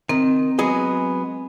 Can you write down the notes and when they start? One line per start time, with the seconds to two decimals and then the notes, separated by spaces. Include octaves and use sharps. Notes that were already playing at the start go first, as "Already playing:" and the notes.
0.09 D#3 C4
0.59 F#3 G#3 B3